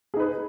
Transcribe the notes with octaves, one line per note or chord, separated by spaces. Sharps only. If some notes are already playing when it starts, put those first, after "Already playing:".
D#4 G#4 B4